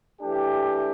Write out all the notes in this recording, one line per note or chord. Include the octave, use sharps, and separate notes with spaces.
E3 A3 D4 G4